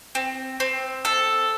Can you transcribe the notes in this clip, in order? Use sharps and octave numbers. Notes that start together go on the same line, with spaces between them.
C4
C4
A4